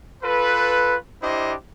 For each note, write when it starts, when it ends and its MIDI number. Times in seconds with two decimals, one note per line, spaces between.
0.23 0.96 65
0.23 0.96 69
0.23 0.96 71
1.23 1.54 62
1.23 1.54 64
1.23 1.54 67
1.23 1.54 72
1.23 1.54 75